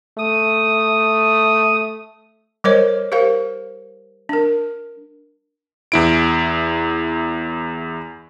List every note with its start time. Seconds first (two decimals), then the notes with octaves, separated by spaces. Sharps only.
0.18 A3 D#6
2.64 G3 A#4 C5 C#5 D#5
3.12 G4 A#4 C5 F5
4.29 D4 A#4
5.92 E2 E4 D7